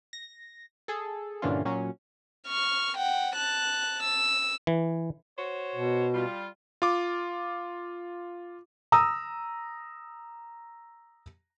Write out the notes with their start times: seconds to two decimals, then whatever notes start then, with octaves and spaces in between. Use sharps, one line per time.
0.13 A#6
0.88 G#4 A4
1.42 G2 A#2 D3 E3 C#4 F4
1.65 A#2 F#3 C#4
2.48 C#6 F6
2.97 F#5 G5
3.36 A5 F#6
4.03 E6
4.67 E3
5.37 F#4 C5 C#5
5.75 B2
6.14 G3 F4
6.82 F4 D6
8.92 A#5 D#6 E6